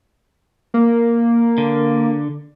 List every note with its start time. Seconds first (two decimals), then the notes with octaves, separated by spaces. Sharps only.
0.74 A#3
1.58 D3